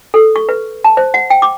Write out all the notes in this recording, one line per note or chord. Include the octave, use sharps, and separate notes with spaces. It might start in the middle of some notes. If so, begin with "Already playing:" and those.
A4
C#6
B4
A5
C5
F#5
G5
D6